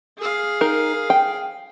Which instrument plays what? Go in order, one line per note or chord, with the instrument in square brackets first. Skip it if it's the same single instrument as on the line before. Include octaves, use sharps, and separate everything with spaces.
[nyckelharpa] G#4 F5
[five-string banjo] D#4 A#4
G5